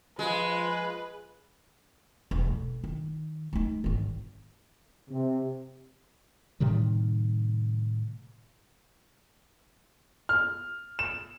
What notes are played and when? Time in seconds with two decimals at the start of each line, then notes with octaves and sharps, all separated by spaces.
0.19 F3 G#3 F4 B4
2.31 E1
2.46 A3
2.84 D#3
3.53 A3 D#4
3.84 G#1 D#3
5.11 C3
6.60 A2 C3 D#3 G3
10.29 F6
10.99 E7